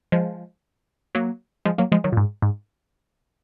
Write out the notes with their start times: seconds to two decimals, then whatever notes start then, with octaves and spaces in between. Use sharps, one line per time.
0.12 F3 G#3
1.15 F#3 A#3
1.65 F3 G#3
1.78 F#3 A#3
1.92 F3 G#3
2.04 D#3 F#3
2.12 A#2
2.17 G#2
2.42 G#2